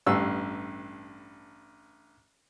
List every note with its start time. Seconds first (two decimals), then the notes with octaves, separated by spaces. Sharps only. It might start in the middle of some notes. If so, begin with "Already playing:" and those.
0.06 A1 G2 E6